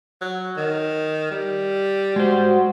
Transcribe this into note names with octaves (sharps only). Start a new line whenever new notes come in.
F#3
D#3
G3
G#3 F#4 C5